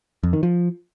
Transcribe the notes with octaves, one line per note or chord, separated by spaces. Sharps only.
F2
D#3
F3